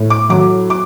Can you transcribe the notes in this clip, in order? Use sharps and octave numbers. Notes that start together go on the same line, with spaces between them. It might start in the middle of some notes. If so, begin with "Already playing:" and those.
Already playing: A2
D6
F#3 D6
D6